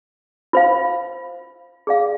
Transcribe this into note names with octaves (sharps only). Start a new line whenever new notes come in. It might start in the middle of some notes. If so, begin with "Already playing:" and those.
F4 C5 F5
G#4 D5 F5